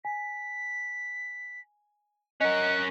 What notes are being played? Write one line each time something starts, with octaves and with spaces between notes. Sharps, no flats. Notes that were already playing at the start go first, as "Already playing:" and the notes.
G#5 B6
C#4 A#4 D#5 F#5 F#6